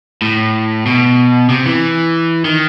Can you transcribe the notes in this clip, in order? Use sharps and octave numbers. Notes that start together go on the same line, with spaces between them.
A2
B2
C3
E3
D#3